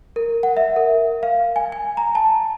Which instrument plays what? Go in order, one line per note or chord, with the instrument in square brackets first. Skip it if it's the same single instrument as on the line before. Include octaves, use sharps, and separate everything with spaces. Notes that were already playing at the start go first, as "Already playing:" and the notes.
[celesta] A#4
F#5
E5
A#4
F5
G#5
G#5
A#5
A5